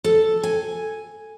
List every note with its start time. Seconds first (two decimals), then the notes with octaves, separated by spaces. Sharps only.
0.04 A4
0.43 G#5